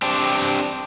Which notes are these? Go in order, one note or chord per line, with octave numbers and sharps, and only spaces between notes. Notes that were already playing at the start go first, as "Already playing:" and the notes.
C4 D4 G4